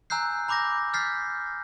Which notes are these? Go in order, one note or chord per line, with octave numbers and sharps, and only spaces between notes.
G#5 A#5 E6 F#6 G6 C7
A#5 B5 D6 G6 A#6
F6 G6 A6 B6 C7